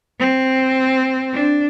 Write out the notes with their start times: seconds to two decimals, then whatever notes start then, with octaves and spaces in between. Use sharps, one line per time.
0.20 C4
1.33 D4